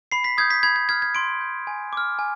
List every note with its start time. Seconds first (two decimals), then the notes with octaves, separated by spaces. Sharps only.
0.12 B5 C7
0.24 B6
0.38 D#6 G6 G#6
0.50 B6
0.63 B5 G#6
0.76 G#6
0.89 F6 G#6
1.02 G#6
1.15 C6 D7
1.41 G6
1.67 G#5
1.93 D6 F6
2.19 G#5